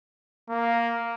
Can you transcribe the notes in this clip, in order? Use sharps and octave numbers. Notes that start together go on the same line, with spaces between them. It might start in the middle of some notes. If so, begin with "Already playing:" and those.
A#3